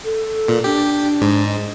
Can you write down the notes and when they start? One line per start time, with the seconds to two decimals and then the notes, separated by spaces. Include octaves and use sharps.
0.04 A4
0.48 A#2
0.64 D4 G4
1.21 G#2
1.47 D#5